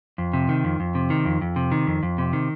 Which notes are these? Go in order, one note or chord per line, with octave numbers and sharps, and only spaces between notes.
F2
C3
D#3
F2
F2
C3
D#3
F2
F2
C3
D#3
F2
F2
C3
D#3